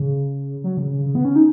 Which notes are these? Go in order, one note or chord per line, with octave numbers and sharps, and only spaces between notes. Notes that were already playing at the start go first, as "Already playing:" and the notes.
Already playing: C#3
F#3
C#3
C#3
C#3
B3
C#4
D#4